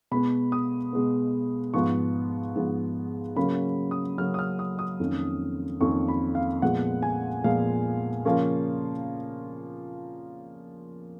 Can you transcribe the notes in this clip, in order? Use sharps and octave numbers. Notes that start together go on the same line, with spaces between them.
B2 G#3 B3 B5
D#6
B2 G#3 B3
G#2 F3 B3 C#6
G#2 F3 B3
C#3 F#3 A#3 C#4 B5
D#6
C#3 F#3 A#3 C#4 F6
D#6
F6
D#6
D#6
F2 D#3 A#3 C#4
F2 D#3 A#3 C#4 C#6
B5
F5
A#2 F3 G#3 B3 F#5
G#5
A#2 F3 G#3 B3 F5
C#3 F3 A#3 C#4